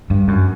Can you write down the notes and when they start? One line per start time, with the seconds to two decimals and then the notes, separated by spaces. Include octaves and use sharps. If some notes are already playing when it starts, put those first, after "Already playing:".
0.10 G2
0.28 F#2